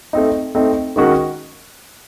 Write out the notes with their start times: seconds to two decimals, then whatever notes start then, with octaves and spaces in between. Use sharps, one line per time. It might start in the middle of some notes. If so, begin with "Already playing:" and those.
0.13 A3 C4 D#4
0.55 A3 C4 D#4
0.96 D#3 G#3 C#4 F#4 A#4